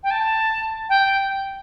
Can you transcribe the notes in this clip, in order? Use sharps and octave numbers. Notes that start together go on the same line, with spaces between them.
G5
A5
G5